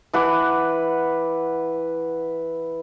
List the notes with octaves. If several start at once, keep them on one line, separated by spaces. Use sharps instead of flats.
E3 B4 F#5 D6